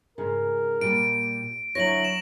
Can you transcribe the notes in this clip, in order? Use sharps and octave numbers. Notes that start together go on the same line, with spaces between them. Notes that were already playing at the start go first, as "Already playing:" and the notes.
G#2 C#3 A#4
A#2 G3 A#3 D7
D2 F#3 E4 C#5 A#6 F#7
E7 F#7